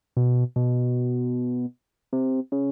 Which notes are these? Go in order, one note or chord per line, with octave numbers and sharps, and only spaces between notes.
B2
B2
C3
C#3